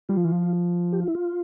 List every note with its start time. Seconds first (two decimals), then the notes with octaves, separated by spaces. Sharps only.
0.09 G3 F4
0.17 F3
0.25 E3
0.32 F3
0.92 G4
1.00 F4
1.08 E4
1.15 F4